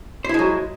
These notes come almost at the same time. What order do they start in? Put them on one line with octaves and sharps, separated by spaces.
C5 E4 G#3 F#3